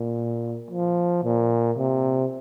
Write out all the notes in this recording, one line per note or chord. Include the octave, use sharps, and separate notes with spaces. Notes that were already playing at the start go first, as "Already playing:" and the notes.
Already playing: A#2
F3
A#2
C3